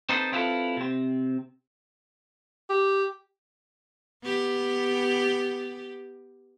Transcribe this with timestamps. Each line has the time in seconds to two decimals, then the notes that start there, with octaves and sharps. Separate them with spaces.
0.09 C4 D#4 A4 B4 C5
0.32 C4 E4 F4 G#4 A4 B4
0.77 C3 C4
2.70 G4
4.23 B3 G4